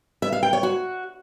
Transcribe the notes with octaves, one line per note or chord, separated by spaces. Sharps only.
E5
F5
G5
C#5
F#4